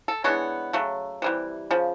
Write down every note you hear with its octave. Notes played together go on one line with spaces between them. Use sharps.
A4
E3 G#3 B3 D4 C#5
C#3 F#3 A3
C3 E3 G3
C#3 F3